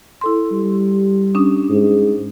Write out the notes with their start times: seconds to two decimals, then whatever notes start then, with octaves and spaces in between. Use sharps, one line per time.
0.21 E4 A4 C6
0.52 G3
1.34 C#4 D4 D#6
1.70 G#2